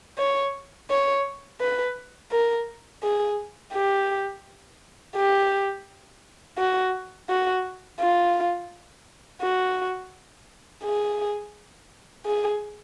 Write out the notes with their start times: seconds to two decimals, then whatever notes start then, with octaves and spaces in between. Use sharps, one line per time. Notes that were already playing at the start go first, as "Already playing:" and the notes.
0.18 C#5
0.90 C#5
1.61 B4
2.32 A#4
3.03 G#4
3.74 G4
5.16 G4
6.58 F#4
7.29 F#4
8.00 F4
9.42 F#4
10.84 G#4
12.26 G#4